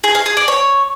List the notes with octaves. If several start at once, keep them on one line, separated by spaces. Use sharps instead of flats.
G#4
F5
G#4
D5
C#5